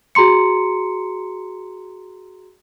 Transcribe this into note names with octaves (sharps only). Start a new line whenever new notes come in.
F#4 G#4 A#5 C6 C#7